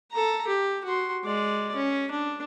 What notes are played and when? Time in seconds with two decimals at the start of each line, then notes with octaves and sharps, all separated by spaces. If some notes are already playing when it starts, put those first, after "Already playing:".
0.12 A4 A#5
0.47 G4
0.85 F#4 C6
1.24 G#3 D5
1.76 C#4
2.11 D4